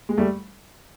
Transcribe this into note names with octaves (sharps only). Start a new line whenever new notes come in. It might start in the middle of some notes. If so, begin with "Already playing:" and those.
G#3
G3 A3